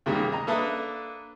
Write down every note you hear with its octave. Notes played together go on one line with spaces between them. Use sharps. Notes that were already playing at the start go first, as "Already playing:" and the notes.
D2 C3 D#3 G3 G#3 A#3
D#5 A#5
A#3 D4 A4 B4 E5 D#6